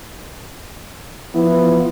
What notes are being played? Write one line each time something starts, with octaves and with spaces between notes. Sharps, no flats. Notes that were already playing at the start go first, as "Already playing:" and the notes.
E3 F3 B3